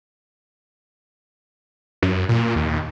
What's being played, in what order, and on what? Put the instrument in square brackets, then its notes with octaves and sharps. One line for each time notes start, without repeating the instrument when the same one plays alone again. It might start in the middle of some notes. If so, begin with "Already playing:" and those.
[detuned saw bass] F#2
A#2
D#2